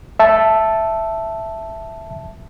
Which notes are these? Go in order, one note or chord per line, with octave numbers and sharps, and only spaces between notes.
E5 A5